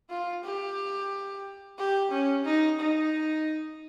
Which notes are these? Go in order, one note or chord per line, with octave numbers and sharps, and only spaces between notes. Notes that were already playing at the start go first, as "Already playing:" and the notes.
F4
G4
G4
C#4
D#4
D#4